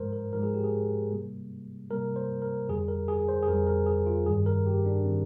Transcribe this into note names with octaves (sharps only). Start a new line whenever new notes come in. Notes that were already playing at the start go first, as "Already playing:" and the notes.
Already playing: G#2 F3 G#3 A#4 C5
A#4
G#2 F3 G#3 A#4
G#4
G4
G#4
C3 G3 A#3
C3 G3 A#3 A#4
C5
A#4
F2 D3 G3 G#4
A#4
G#4
C5
G#4
F2 D3 G3 A#4
A#4
G#4
F4
G2 D#3 G3 G#4
A#4
G4
D4
D#3 G3 C4